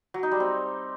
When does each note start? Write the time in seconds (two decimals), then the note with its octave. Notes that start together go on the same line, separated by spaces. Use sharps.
0.14 F#3
0.23 D#4
0.32 G3
0.40 C4